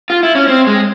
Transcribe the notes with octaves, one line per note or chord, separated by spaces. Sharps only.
F4
E4
C#4
C4
G#3